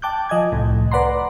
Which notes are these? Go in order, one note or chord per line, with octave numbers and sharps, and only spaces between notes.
G5 A5 D6 F#6 G6
F3 D#5 G#5 G#6
C2 A2
B4 D5 F#5 A#5 C6